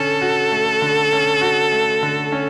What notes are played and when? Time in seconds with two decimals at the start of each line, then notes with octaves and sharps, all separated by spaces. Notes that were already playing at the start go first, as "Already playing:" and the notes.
Already playing: D3 C#4 A4
0.22 F#4
0.51 A3
0.82 D3
1.12 C#4
1.41 F#4
1.72 A3
2.03 D3
2.32 C#4